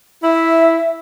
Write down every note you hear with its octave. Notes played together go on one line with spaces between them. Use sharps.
E4 E5